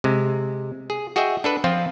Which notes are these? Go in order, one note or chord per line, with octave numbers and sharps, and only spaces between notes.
C3 G#3
G#4
F#4 G#4 D#5 E5 G5
D4 A4 B4
F3 C4 F4